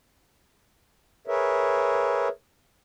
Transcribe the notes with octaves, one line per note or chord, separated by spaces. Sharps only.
G#4 A#4 B4 C#5 E5